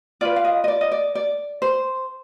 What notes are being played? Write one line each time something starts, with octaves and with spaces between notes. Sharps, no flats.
F4 B4 D5
F5
D#5
D#5
D5
D#5
D5
D5
C5